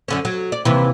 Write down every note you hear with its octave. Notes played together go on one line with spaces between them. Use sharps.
F#2 D3 C#4
F#3
D5
D#2 C3 E3